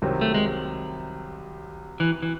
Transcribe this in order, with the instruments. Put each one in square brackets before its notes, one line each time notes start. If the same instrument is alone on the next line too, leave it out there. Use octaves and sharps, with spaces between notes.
[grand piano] C2 C3 D#3 F#3 C4
[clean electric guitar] A3
G#3
E3
E3